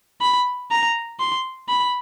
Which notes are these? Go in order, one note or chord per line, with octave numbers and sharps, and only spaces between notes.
B5
A#5
C6
B5